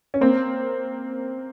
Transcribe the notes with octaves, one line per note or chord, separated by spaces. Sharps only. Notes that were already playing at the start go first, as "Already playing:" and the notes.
C#4
A#3 C4